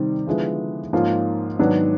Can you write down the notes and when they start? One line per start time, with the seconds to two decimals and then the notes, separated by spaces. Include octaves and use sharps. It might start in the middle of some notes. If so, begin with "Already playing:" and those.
Already playing: C3 D#3 G3 C4
0.27 D3 F3 G#3 B3 E4
0.93 G#2 F3 A#3 C#4 F4
1.59 G#2 D#3 F#3 B3 D4